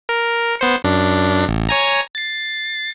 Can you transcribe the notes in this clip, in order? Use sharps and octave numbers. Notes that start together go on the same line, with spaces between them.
A#4
B3 C5 C#7
F#2 D4
A1
C#5 G#5 A#5
A6 C7